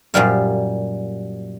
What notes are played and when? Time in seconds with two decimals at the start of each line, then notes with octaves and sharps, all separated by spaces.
0.14 F#2 A#2 G3 F5